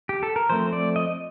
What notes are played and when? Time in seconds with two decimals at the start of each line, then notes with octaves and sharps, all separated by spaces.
0.09 G4
0.23 A4
0.36 A#4
0.50 F3 A3 C4 C5
0.73 D5
0.96 D#5